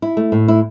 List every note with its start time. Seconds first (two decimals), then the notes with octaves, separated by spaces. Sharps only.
0.02 E4
0.17 A3
0.32 A2
0.48 E4